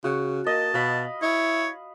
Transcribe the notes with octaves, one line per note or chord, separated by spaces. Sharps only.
C#3 F#4
A#3 D#5 A5
B2 F5 B5
E4 C#5